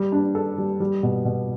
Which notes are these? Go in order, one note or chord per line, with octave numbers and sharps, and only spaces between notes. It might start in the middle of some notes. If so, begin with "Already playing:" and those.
Already playing: G3
D4
A4
G3
G3
B2
B2